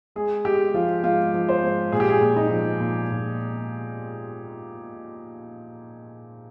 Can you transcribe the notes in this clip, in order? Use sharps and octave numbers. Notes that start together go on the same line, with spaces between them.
G#3 G#4
G#3 G4
F3 F4
G#2 F4
F3
C5
G#2
A#2 G#4
G4
G#4
A#2
D#4
F3
A#2
A#2